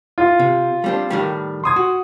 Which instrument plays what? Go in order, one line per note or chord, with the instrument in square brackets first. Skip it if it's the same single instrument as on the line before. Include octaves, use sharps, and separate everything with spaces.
[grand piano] F4
[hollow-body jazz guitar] C3
G3 C4 D4
A2 D#3 G3
[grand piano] C6 D#6 G#6
[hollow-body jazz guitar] F#4